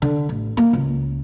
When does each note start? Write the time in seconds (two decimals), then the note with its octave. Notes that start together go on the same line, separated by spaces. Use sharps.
0.02 D3
0.29 A1
0.57 A#3
0.73 C#2